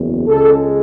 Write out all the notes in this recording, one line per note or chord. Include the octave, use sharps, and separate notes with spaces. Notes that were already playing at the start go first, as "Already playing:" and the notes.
Already playing: F#1 E2
C#2 C#3 G#3 A4